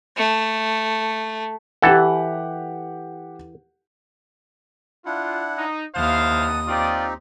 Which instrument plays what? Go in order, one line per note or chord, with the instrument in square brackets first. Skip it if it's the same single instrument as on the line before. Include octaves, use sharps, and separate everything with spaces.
[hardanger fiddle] A3
[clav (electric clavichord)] E3 A4 [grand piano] G4 F#5
[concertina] D4 E4 F#5 [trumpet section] F4
[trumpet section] D#4
[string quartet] D#2 D#6 [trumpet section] E4 C5 F5 [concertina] F#5 A5
[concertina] C4 D#4 G4 [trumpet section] F4 D5